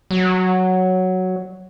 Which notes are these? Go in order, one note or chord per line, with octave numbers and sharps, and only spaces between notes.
F#3